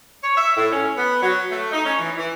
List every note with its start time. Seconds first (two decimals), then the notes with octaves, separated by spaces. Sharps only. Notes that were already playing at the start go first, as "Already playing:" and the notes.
0.23 C#5
0.37 E5
0.57 A2
0.72 C#4
0.97 B3
1.22 F#3
1.50 A3
1.72 D#4
1.84 C#4
1.99 E3
2.17 E3